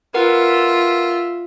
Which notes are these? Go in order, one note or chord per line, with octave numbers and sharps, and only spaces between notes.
F4 A#4 B4 E5 F#5